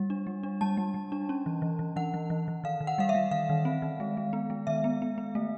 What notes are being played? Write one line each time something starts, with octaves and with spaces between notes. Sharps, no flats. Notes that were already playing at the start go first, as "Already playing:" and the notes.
Already playing: G3
D4
G3
D4
G3 A5
G3
G3
D4
C#4
E3
E3
E3
E3 F#5
E3
E3
E3
D#3 F5
D#3
F#5
G3 F5
E5
G3
D#3 F5
D#3
C4
D#3
G#3
G#3
B3
G#3
D#3 E5
B3
B3
B3
A3